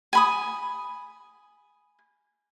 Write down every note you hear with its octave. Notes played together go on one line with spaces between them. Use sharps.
G#5 B5 D#6